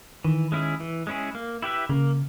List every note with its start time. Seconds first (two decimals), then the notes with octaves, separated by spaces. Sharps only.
0.24 D#3 E3
0.52 G#3 C#4 E4 G#4
0.80 E3
1.07 G#3 C#4 E4 G#4
1.35 A#3
1.62 E4 G4 B4 E5
1.89 C#3 A#3